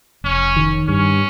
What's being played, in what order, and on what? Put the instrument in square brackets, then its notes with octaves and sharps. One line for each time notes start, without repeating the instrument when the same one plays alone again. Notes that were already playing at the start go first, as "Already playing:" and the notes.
[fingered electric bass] F1 [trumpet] C#4
[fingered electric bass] D#3
[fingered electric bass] G2 [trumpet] C#4